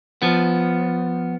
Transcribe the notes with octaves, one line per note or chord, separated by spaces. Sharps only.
F3 B3